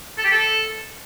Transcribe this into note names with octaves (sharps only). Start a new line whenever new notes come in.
A4
G4
A4